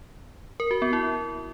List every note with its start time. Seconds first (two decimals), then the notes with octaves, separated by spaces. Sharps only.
0.60 A#4
0.71 F#4
0.82 B3
0.93 E4